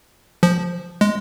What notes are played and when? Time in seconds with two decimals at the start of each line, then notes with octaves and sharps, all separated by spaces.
0.43 F3
1.01 G#3